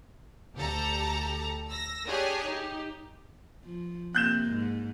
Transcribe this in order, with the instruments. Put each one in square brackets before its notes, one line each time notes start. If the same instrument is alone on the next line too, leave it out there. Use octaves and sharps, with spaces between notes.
[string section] D2 G4 A4 A5 A#5
E6 A#6
D4 G4 G#4 C#5 G#5
D#4 G4
[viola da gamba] F3
[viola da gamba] C3 A#3 [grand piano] F#6 G6 E7
[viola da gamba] G#2